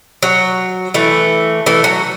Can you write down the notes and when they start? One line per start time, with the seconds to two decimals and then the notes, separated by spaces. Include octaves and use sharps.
0.23 F#3
0.94 E3 A3
1.66 E3 A3
1.84 F#3